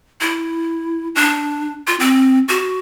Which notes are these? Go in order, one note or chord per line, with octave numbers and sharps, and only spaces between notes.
E4
D4
F4
C4
F#4